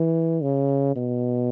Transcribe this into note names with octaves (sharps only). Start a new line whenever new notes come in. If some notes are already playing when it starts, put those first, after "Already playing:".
Already playing: E3
C#3
B2